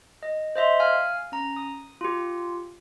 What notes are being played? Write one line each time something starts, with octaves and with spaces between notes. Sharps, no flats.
D#5
C5 D#5 E5 C6
F5 G#5 F6
C#4 A#5
D#6
F4 G4